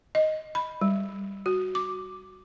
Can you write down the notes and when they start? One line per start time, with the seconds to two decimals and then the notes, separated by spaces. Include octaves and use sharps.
0.15 D#5
0.55 B5
0.81 G3
1.46 F#4
1.75 D6